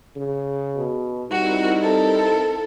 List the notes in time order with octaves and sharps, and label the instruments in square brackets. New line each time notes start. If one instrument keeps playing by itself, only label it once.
[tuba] C#3
[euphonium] B2
[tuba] G3 [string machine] C4 E4 A#4 [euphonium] D#4 [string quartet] F#4
[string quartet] A4